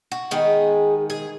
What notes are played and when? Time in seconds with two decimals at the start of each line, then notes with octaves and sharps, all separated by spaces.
0.12 F#4
0.31 D#3 G#3 B3 G#4
1.10 G#4